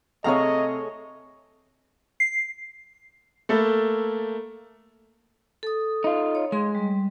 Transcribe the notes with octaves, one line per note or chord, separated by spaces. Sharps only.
C3 A3 G#4 C#5 D#5 F5 A#5
C7
A3 A#3 A4 B5
A4 D#6
D#4 F4
C#5
G#3 G#4 C6
G3